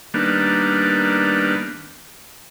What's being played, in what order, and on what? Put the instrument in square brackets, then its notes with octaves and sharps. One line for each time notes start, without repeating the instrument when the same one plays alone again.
[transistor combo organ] D#3 G3 A#3 B3 D4